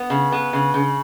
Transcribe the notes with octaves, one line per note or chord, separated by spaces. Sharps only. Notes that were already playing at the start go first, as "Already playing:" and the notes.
Already playing: B3
C#3
B3
C#3
C#3